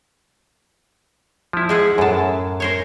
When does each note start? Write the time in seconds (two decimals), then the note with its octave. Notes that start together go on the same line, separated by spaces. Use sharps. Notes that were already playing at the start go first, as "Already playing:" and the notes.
1.53 F3 E4
1.69 G#3 G#4 F#5
1.98 F#2 A2 B3 A5
2.60 A#4 C5 C#5